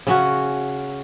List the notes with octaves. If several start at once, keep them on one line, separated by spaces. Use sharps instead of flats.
C#3 C#4 F#4